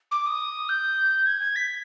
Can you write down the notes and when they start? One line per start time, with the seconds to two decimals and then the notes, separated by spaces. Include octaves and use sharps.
0.11 D6
0.26 D#6
0.69 G6
1.26 G#6
1.41 G#6
1.55 B6